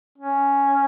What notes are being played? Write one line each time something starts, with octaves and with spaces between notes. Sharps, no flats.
C#4